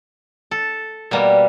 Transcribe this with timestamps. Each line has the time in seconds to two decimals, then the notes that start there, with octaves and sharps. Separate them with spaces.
0.51 A4
1.11 B2 G3 A#3